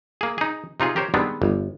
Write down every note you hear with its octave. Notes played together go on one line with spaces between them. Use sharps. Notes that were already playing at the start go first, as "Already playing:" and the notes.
A#3 G#4
D#4 G#4
C3 D#4 F4 G#4
G4 A#4 C5 C#5
D#3 G3 G#3 B3 C4 D4
G1